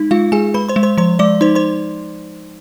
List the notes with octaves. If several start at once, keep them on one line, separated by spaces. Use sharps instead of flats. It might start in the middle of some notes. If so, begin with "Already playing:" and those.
Already playing: G#3 D#4
G#3 F4 F5
G#3 G#4 G#5
G#3 B4 B5
C5 C6
G#3
C5 C6
F3 C5 C6
G#3 D5 D6
D#4 C5 C6
C5 C6